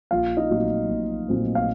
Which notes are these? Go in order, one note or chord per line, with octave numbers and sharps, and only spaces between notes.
A#1 F4 F5
D#4 D#5
A#2 F#3 A3 C4
A#1
A#2 F#3 A3 C4
F5